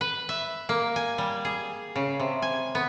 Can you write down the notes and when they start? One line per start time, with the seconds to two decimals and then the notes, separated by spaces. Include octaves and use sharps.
0.01 B4
0.29 E5
0.69 A#3
0.96 G#5
1.18 G3
1.45 G#4
1.96 C#3
2.20 C3
2.42 G#5
2.75 B3